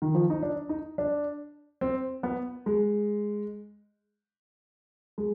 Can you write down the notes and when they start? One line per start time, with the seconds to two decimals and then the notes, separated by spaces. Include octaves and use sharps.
0.02 D#3
0.15 F3
0.30 D#4
0.43 D4
0.69 D#4
0.98 D4
1.81 C4
2.23 B3
2.66 G#3
5.18 G#3